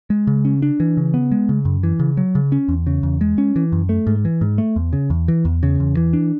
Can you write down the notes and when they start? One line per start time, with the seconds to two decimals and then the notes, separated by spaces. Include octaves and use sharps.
0.10 G#3
0.27 C#3
0.45 C#4
0.62 D4
0.80 E3
0.97 C#3
1.14 B3
1.32 G#3
1.49 C#3
1.65 F#2
1.83 E3
1.99 C#3
2.17 F#3
2.35 C#3
2.52 C#4
2.68 E2
2.87 C#3
3.03 E2
3.21 G#3
3.38 C#4
3.56 E3
3.72 F#2
3.89 A3
4.07 G#2
4.25 E3
4.41 G#2
4.58 A3
4.76 E2
4.93 C#3
5.10 E2
5.28 E3
5.45 E2
5.63 C#3
5.80 E2
5.97 E3
6.13 D4